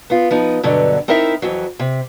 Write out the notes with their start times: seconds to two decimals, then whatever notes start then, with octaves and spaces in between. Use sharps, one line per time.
0.10 B3 F4
0.31 F3 B3 D#4
0.63 G2 B2 D3 F#3
1.08 C4 D#4 E4 A#4 E5
1.42 F2 E3 F#3
1.80 C3